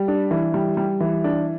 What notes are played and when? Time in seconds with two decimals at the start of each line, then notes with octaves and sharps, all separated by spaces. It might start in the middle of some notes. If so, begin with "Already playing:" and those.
Already playing: G3
0.08 D4
0.31 E3
0.54 G3
0.77 G3
1.00 E3
1.24 D4